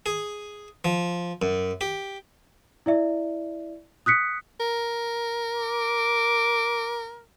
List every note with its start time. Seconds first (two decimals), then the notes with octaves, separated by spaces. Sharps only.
0.06 G#4
0.85 F3
1.42 F#2
1.81 G4
2.86 E4 D5 E5
4.06 D#6 F#6 B6 C#7
4.60 A#4
5.56 D6